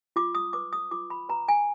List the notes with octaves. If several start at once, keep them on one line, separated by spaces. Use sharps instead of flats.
F4 D6
D#6
B4 D6
D#6
F4 D6
B5
B4 A#5
G#5